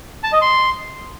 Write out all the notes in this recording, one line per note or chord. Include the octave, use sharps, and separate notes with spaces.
A5
D#5
C6